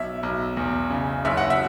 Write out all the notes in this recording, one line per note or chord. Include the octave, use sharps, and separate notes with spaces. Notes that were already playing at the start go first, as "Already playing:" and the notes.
Already playing: B1 E5
B1
E2
C#3
F#1 E5
F#5
E5